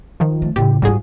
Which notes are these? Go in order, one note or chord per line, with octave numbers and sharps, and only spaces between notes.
D#3 F3
A3
A2 C#3 G4
G#2 G3 F4 F#4 G#4